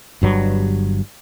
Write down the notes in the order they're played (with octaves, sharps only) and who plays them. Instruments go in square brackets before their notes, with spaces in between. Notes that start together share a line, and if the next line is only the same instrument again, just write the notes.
[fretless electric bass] G1 G2 F#3